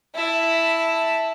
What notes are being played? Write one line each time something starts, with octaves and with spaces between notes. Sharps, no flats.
E4 A5